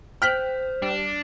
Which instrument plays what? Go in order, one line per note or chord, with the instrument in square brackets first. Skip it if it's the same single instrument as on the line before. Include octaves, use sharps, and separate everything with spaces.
[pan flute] C5 [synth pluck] G5 F#6 [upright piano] F6 B6
[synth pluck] G3 [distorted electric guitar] D4